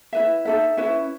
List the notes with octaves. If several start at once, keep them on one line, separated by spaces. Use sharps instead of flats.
E4 B4 E5
D#4 F#4 A4 E5
C#4 E4 B4 E5